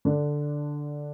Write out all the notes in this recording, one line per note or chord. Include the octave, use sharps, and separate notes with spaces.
D3 D4